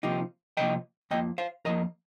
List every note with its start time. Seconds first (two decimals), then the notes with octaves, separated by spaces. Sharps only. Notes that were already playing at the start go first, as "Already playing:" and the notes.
0.03 C2 C3 F3 A#3 D#4 G4
0.57 C2 C3 F3 A#3 D#5 G5
1.11 F2 F3 A#3 D#5 G5
1.38 C5 F5
1.65 F2 F3 A#3 A#4 D#5